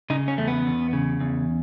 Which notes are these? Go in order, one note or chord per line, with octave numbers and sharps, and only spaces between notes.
C#3 D#4
C#4
E2 A3
B3
E2
C#3
E2